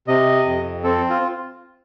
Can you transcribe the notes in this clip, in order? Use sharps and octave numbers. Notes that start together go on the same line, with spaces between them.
C3 D#5
F2
C4 A4
F4